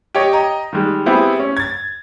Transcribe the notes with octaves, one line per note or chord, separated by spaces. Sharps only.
G4 C#5 D#5
D#5 G5 A#5
D#3 G3 G#3
B3 C4 E4 G4 G#4
C#4
G#6 A6